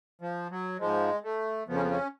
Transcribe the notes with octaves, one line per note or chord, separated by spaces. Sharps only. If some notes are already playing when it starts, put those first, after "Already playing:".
F3
F#3
G#2 F3 G#3
A3
F2 C#3 F3 B3
C#4
B3
C#4